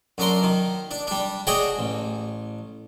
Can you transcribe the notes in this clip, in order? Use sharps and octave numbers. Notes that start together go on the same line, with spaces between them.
F#2 D4 A#4 C6
D#3
D4
G3 D4
D4 F#4 G#4 C#5 D#5 G5
A1